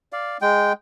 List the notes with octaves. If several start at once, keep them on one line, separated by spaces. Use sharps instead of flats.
D5 F5
G#3 G5